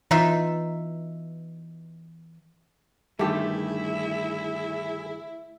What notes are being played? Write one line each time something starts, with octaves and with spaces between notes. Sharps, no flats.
E3 D#4 F4 E5
G2 D3 D#3 A3 E4 G4 G#4